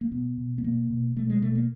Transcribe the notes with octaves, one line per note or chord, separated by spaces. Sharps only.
A#3
B2 B3
B2
B3
B2 A#3
B2
B2 A3
G#3
B2 A3
A#3